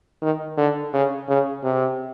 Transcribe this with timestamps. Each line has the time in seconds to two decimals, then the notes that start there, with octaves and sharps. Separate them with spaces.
0.22 D#3
0.57 D3
0.93 C#3
1.28 C#3
1.64 C3